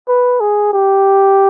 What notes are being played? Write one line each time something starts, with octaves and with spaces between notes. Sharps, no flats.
B4
G#4
G4